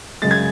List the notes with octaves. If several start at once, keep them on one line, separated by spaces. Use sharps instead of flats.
F#2 C#3 G#3 A6
G#6